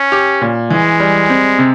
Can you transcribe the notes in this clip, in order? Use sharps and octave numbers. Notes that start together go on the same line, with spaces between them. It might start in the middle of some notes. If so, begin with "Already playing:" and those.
Already playing: C#4
G4
A#2
E3 G#3
G3
C4
C3